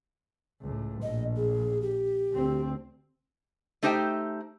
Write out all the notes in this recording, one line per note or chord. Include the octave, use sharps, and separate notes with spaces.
C#2 A2
A#1 D#5
G#4
G4
D2 C4
A3 D#4 G4 C5 E5 G5